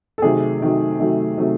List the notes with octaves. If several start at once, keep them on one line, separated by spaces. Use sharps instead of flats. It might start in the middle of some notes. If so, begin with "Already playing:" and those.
A4
C3 D#3 F#3 A3 G#4
C3 D#3 F#3 A3
C3 D#3 F#3 A3
C3 D#3 F#3 A3